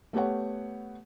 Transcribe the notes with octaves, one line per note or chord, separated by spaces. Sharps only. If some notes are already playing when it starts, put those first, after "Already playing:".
A3 B3 G4 C#5 F#5